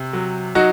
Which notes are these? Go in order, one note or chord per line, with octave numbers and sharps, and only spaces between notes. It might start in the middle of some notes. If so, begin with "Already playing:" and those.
Already playing: C3
F#3
F#3 D#4 F#4